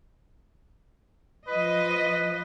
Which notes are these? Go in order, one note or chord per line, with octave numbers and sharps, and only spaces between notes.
F3 B4 D#5